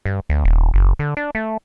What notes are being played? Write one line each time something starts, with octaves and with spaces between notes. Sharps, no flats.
G2
D2
D#1
F#1
D3
D4
A3